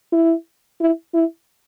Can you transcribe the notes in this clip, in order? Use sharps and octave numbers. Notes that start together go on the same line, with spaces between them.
E4
E4
E4